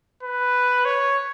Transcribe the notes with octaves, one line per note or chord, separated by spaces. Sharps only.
B4
C#5